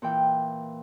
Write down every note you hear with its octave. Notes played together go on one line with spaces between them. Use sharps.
A#2 E3 G5